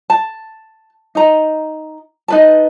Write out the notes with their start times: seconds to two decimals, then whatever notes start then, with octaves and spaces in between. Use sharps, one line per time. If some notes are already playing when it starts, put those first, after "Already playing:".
0.10 A5
1.15 D#4 A#5
2.28 D#4 B4 A5